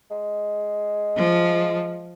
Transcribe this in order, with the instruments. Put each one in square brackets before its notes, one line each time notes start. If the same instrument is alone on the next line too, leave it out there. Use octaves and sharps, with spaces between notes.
[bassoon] G#3
[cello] F3